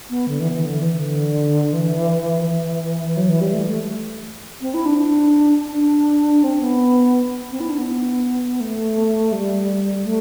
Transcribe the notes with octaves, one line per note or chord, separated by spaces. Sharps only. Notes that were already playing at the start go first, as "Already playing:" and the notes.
B3
D3
E3
E3
D3
E3
D3
E3
E3
F#3
E3
G3
A3
A3
C4
E4
D4
D4
D4
C4
B3
C4
E4
D4
B3
A3
G3
A3